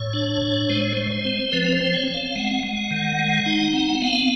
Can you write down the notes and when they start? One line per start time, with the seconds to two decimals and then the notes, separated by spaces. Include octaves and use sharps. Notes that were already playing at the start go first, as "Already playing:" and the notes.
Already playing: A2 C#5
0.13 D4
0.42 A2
0.70 G#3 C5
0.81 C#5
0.93 G#3 C5
1.11 C5
1.25 C4
1.52 F3 B4
1.73 C5
1.80 C4
1.93 C#5
2.08 C4
2.14 F5
2.35 G#3 F#5
2.63 G#3
2.91 D#3
3.19 G#3
3.46 D#4
3.73 C4
4.01 B3 F5